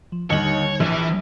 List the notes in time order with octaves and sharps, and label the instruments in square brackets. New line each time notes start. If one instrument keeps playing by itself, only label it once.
[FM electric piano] F3
[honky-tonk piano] D#2 D#5 F#7 [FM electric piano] D3 G3 D#4 [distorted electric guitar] C#5
[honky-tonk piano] A#1 [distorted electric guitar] E3